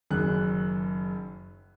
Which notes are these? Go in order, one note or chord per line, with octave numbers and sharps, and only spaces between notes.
F#1 F#2 D#3 F#6